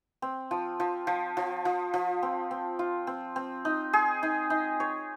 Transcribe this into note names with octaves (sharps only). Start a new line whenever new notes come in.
C4
F3
F3
F3
F3
F3
F3
C4
C4
F4
C4
C4
D#4
G#4
D#4
D#4
C#5